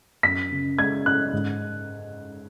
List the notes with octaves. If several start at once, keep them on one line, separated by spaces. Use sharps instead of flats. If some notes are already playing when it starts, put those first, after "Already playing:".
F#2 B6
C#3
G#3 G#6
C#4 F#6
G#2